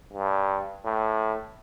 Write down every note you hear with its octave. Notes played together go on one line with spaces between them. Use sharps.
G2
A2